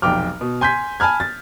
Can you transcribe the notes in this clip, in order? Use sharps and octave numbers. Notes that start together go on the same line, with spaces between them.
F1 B1 G5 D6 F6
B2
G#5 C6 G6 G#6 B6
G#5 A5 B5 F6 G#6
A6